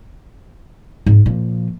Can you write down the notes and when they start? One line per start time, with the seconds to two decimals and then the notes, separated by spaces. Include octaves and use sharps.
1.06 G#2
1.26 A#2 F3